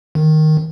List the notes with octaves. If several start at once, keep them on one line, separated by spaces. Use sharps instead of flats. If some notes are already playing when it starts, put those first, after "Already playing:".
D#3